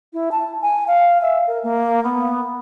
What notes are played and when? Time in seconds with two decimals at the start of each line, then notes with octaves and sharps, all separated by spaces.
0.13 E4
0.31 A5
0.62 G#5
0.87 F5
1.22 E5
1.47 A#4
1.63 A#3
2.03 B3